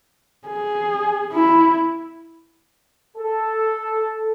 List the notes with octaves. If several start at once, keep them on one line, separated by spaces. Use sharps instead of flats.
G#4
E4
A4